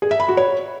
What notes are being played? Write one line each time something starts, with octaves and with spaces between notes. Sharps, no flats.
G#4
E5
B5
F#4
C#5